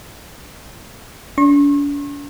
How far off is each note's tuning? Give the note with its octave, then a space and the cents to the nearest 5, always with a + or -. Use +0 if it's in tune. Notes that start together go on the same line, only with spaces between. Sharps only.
D4 -45 C#6 -45